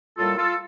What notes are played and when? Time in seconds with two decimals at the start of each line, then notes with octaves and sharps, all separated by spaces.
0.17 A2 G3 A#3 F4 A4
0.37 F4 A4